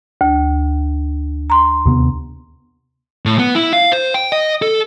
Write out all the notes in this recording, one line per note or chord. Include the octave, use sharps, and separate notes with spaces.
D2
A#5 C6
D#2 C3 B3
A2
B3
E4
F5
C5
G5
D#5
A4